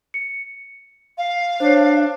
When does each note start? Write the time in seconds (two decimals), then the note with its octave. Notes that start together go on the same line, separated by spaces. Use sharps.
0.14 C#7
1.17 F5
1.60 D4 C5 C#5